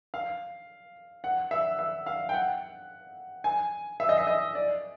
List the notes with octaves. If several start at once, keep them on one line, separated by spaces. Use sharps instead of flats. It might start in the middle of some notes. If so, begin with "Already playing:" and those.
F5
F#5
E5
E5
F5
G5
F#5
G#5
E5
D#5
E5
D#5
D5